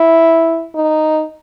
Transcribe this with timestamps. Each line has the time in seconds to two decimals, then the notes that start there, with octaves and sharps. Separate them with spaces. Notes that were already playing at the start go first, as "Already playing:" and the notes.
Already playing: E4
0.75 D#4